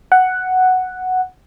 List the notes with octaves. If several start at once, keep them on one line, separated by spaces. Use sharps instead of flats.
F#5